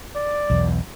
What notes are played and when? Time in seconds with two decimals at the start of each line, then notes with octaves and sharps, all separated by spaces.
0.16 D5
0.50 B1 E2